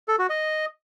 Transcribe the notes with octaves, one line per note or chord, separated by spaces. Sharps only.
A4
F#4
D#5